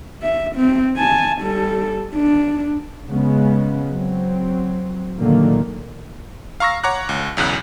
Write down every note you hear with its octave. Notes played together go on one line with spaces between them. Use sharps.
E5
C4
G#5 A5
G3 A4
D4
C#3 G#3 B3 C#4
F#3 C4
A#2 D3 D#3 F#3 A3 A#3
F5 A#5 C#6 E6 A#6
C#5 F#5 A#5 D6 F#6
C#2
B1 E2 C#3 F#6